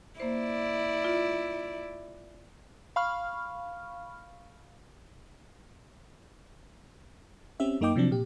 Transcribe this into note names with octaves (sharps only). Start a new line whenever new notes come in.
A#3 E4 C5 D5
F4
F5 B5 C#6 F6
C4 C#4 G4 E5
F#2 A#3 D#4 D#5 G5 D6
C3 F3 F#3 C4 D4
A#2 G4